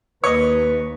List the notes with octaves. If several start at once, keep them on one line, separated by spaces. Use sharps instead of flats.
D#2 B4 C#5 D#5